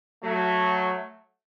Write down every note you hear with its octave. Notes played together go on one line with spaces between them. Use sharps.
F#3 A3